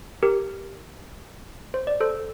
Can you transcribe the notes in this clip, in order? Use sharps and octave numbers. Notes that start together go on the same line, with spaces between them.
G4 A#4
C5
D5
A4 C5